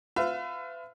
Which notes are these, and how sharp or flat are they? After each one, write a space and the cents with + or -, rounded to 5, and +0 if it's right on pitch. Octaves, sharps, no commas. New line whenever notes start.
F4 +25 B4 +40 E5 +40